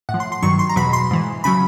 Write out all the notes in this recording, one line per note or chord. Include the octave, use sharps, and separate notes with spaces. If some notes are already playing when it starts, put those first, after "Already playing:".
A2 F#5
F3
C6
C6
G2 D#3 F#3 C#6
C6
A#5
E2 B2 F#3 B5
C6
G#2 E3
C#3 F#3 B5